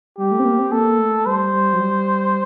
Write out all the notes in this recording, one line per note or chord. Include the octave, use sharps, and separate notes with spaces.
G3 G4
A3
C4
A#3
C4
A#3 A4
A3
G3 C5
G3
F#3
G3